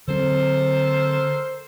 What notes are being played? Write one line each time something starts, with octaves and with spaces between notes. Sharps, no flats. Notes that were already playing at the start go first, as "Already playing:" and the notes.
D3 F#3 C4 A4 A#4 C5